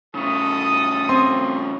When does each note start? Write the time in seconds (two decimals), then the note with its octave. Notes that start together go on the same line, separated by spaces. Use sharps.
0.15 C#3 A3 A4 D#6
1.09 C4 C6